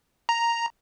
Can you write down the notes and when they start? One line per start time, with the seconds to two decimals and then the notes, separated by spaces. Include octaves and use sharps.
0.29 A#5